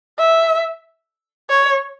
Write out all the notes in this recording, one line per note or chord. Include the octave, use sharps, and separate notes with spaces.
E5
C#5